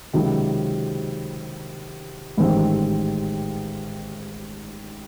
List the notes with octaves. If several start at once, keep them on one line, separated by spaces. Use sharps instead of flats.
C#2 C3 D#3 F#3
A1 G#2 D#3 G3 C4